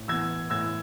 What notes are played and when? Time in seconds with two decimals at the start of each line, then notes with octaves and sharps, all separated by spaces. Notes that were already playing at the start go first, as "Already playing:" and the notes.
Already playing: A2
0.08 E3 B3 E6 G#6
0.50 A2 E6 G#6